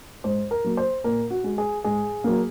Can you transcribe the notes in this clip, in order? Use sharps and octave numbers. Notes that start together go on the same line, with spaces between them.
G#2 C5
A#4
F#3 A#3
C5
A#2 A#4
F#4
G#3
G#4
G#2 G#4
F#3 A#3